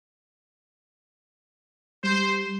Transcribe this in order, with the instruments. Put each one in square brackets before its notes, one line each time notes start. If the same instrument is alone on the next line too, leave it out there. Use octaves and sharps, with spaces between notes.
[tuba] G3 [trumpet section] C5